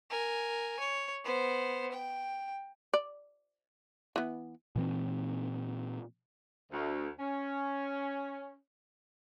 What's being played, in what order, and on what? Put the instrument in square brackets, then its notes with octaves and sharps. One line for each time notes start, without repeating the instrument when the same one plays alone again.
[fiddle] A#4 G#5
C#5
B3 C5
G5
[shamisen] D5
E3 B3
[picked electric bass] A#2 E3 C4
[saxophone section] D2
C#4